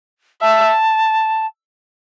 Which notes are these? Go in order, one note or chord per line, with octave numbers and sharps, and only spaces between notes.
E5 A5